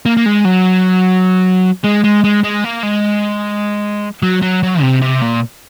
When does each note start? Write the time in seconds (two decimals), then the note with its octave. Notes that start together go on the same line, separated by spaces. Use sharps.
0.06 A#3
0.17 A#3
0.26 G#3
0.45 F#3
1.84 G#3
2.04 G#3
2.24 G#3
2.43 G#3
2.64 A#3
2.83 G#3
4.23 F#3
4.42 F#3
4.63 F#3
4.82 C3
5.02 C3
5.22 A#2